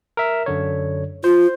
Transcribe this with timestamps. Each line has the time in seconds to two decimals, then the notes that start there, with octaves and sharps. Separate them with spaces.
0.17 A#4 E5
0.46 F#2 D3 C#5
1.24 F4 C5